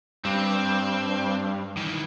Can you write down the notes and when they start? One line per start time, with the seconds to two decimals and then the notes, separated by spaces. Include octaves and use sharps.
0.25 G2 C4
1.77 D#3 E3